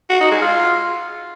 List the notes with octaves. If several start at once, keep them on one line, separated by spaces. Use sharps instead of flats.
F#4
D#4
G#3
F4